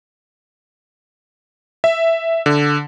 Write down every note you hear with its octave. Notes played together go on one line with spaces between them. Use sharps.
E5
D3